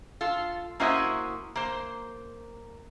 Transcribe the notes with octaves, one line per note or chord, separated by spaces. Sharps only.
F4 A4
A#3 C#4 E4 F#4 C5 D#5
A#3 C5